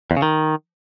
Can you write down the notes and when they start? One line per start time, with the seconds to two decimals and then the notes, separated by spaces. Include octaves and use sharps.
0.11 E2
0.17 C#3
0.22 D#3